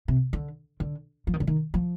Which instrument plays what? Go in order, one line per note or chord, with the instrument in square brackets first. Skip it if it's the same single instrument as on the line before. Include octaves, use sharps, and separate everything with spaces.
[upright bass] C3
D3
D3
F3
D#3
D3
D#3
F3